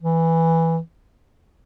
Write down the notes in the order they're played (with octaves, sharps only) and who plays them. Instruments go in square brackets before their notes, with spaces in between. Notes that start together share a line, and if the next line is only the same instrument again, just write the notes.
[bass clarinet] E3